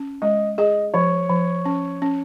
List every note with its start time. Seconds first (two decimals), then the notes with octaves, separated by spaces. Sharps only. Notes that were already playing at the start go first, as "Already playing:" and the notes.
Already playing: C#4
0.22 G#3 D#5
0.58 G#4 D#5
0.94 F3 C#5
1.29 F3
1.65 C#4
2.02 C#4